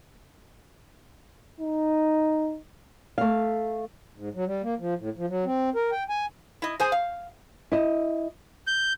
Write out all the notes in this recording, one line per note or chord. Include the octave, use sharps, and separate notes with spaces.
D#4
A3 F5
G#2
F#3
G3
A#3
F3
A2
F3
F#3
C4
A#4
G5
G#5
E4 D#5
G#4 C5 G#5
F5
E4 D#5
G6